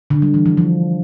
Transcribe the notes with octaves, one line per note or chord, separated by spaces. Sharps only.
D3
G3
E3
F3
F3